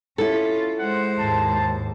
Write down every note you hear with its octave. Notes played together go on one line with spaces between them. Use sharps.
C#4 E4 F4 A4
G#3 C5 F#5
D#2 G#2 A5